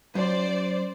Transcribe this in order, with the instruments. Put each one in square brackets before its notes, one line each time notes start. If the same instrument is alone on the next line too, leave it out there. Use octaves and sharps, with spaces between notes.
[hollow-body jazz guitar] F#2 [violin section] C5 D5